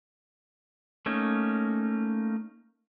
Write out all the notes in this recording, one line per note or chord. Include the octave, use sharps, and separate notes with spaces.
A3 A#3 C#4 D#4